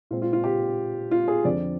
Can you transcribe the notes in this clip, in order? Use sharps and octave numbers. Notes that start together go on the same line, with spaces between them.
A#2 G#3 C4 F4
F4
F4
G4
F4
G#4
F2 D3 F3 C4 D5